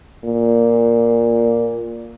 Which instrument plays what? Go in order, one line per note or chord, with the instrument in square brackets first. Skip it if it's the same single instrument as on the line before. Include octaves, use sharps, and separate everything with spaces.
[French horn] A#2